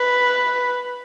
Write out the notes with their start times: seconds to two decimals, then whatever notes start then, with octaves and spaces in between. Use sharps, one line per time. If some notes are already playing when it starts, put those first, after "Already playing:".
Already playing: B4